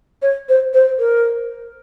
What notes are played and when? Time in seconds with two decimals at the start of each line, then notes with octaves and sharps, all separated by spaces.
0.22 C#5
0.48 C5
0.73 C5
0.99 A#4